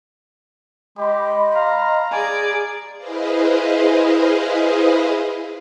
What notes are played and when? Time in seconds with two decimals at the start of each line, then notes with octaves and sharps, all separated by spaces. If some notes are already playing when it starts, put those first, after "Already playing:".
0.98 G#3 G4 D#5 B5 C6
1.54 F5 A#5
2.12 G#4 D5 G#5
2.97 E4 G#4 B4 C5 D#5 F5